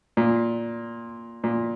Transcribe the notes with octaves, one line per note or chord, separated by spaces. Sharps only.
A#2
A#2